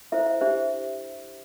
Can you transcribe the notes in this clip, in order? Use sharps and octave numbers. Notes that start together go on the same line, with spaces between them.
E4 A4 C5 E5
E5
D4 G4 C5 E5